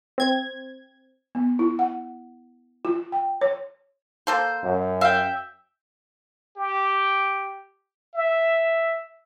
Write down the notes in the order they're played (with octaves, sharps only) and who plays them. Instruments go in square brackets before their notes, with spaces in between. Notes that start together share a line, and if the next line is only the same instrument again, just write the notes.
[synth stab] C4 G#6
[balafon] B3
E4
F#5
F4
G5
C#5
[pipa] A#3 A4 C5
[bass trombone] F#2
[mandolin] E5 G5 [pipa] F5
[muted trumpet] G4
E5